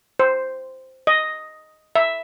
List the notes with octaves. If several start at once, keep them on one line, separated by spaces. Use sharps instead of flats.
C5
D#5
E5